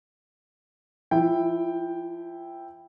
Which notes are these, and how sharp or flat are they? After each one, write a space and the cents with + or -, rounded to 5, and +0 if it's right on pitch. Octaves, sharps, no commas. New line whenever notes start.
F3 -30 E4 +0 G5 +0